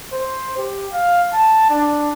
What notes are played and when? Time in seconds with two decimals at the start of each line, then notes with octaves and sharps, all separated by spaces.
0.13 C5
0.58 G4
0.92 F5
1.33 A5
1.70 D4